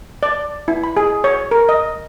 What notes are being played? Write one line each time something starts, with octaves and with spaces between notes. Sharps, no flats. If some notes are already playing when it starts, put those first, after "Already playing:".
D5
E4
B5
G#4
C#5
A#4
D#5